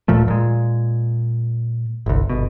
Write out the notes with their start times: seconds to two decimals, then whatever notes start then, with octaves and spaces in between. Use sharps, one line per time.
0.08 D1 A#2 F3 A3
0.28 A#2 G#3
2.06 G1 C2
2.30 G1 B2